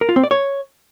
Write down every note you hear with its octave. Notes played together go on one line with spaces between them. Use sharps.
A#4
F4
C4
D5
C#5